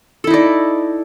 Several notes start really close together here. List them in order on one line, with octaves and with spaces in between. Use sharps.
A4 E4 D#4 D5